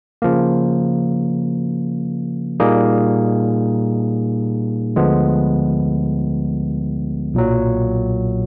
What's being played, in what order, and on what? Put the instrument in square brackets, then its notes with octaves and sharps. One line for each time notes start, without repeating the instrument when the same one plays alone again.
[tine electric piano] C#3 F3 A#3
A#2 G3 A#3 D#4 G#4
D2 D3 F3 G#3 B3
B1 A#2 F#3